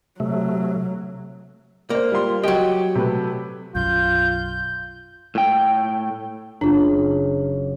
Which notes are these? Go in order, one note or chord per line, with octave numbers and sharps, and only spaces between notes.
C3 F#3 A3
A#3 C5 D5
G3 F4 C6
F#3 G4 D#5 G5
C3 A3 B4
B1 F#2 F4 G6
A2 G5
F#1 D4 F4